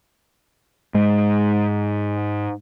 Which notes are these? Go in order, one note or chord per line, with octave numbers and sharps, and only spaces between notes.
G#2 G#3